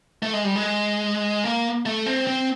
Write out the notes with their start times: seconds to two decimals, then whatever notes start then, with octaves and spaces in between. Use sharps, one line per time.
0.23 A3
0.33 G#3
0.45 G3
0.56 G#3
1.45 A#3
1.86 A3
2.06 C4
2.27 C4